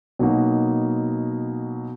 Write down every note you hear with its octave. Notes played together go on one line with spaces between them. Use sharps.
B2 F#3 A#3 D#4 F#4